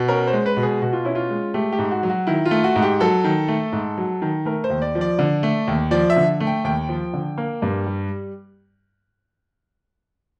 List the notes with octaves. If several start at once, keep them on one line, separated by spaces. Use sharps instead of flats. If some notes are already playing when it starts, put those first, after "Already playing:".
Already playing: B2
C#4 A#4
C5
G#3
B4
B2
G#4
B2 F#4
F4
C#4 E4
F4
G#3
A3 G4
G4
G#2
F#4
F#3
F#4
D#3 E4
F4
A3
F#4
G#2
G4
F#3 A4
D#3
A3
G#2
F#3
D#3
A3 A#4
C5
D#2
D5
F3
D5
D3
A3
D#2
F3 D5
E5
D3
A3
G5
D#2 G5
F3
D3
A#3
G2
G3